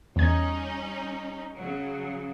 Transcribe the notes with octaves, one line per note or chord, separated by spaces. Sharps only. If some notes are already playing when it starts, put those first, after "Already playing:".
E2 G3 C#4 D#4 G#6
C#3 F#3